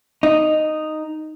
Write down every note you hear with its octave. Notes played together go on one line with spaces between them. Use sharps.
D#4